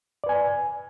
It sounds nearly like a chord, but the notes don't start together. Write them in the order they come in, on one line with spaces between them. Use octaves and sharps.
D5 B4 G#5